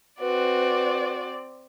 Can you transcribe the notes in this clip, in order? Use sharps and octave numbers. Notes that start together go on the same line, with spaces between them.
C4 F#4 B4 D5